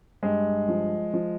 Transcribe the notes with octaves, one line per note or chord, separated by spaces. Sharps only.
G2 G#3
F3
F3